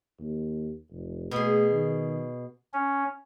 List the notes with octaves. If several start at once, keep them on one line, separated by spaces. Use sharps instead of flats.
D#2
F1
B2 A3 G#4
D#3
C#4